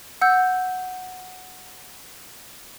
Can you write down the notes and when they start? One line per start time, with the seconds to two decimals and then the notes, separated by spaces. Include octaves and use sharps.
0.21 F#5 E6 G6